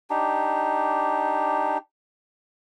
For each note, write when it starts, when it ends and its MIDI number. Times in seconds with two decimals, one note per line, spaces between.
0.10 1.78 62
0.10 1.78 63
0.10 1.78 67